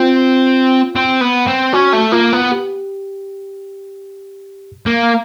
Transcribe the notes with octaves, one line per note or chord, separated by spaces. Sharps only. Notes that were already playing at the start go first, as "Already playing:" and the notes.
Already playing: C4 F4
C4
B3
C4
C#4 F#4
A3
A#3 F4
B3
G4
A#3